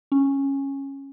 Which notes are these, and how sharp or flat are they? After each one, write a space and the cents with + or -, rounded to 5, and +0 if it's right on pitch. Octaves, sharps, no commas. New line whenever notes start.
C#4 -10